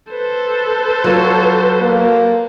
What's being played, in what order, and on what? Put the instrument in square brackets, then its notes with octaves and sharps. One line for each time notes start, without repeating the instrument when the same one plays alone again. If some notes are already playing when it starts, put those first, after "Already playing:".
[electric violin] A4 C5 [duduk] B4
[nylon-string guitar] F#3 F4
[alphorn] A#3